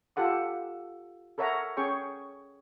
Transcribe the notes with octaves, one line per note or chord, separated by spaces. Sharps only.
F4 G4 A4 F#5 D6
A4 A#4 C#5 E5 F#5 A#5
C#4 G#4 C#5 G5 C#6